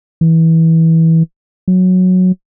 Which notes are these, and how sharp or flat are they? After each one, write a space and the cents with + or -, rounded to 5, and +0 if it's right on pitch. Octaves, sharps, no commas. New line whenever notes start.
E3 -20
F#3 -10